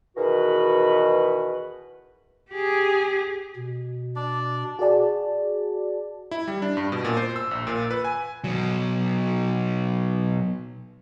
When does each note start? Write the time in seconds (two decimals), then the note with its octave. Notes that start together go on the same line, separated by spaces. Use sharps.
0.16 E2 B2 D#3 F#4 B4
2.51 G4 G#4
3.56 B2
4.16 D4 D5
4.79 F#4 G#4 D5 A5
6.31 E4
6.47 G3
6.62 D4
6.77 G2
6.92 B2
7.05 A#2
7.17 C5
7.36 E6
7.51 A#1
7.67 A#2
7.91 B4
8.05 G#5
8.44 B2 F#3